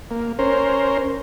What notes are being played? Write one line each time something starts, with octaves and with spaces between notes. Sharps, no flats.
A#3
C#4 A#4 C5